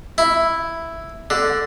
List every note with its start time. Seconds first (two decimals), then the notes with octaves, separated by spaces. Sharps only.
0.18 E4
1.30 D3